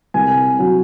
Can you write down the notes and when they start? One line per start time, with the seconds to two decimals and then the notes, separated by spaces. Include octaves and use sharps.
0.14 C2 G#5
0.59 F#3